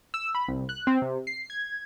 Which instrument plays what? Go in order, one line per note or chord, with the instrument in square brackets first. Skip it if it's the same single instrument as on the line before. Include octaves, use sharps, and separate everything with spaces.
[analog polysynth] E6
B5
C2
F#6
C4
C3
C7
G#6